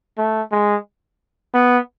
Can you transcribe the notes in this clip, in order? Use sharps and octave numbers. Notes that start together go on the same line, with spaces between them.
A3
G#3
B3